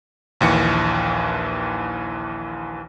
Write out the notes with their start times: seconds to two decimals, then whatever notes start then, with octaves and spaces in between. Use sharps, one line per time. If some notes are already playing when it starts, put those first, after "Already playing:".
0.41 A#1 D#2 E3 C#7